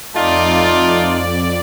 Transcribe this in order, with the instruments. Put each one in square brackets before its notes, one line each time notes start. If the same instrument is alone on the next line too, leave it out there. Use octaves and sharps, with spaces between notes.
[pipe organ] F2 D5 [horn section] A3 D#4 F4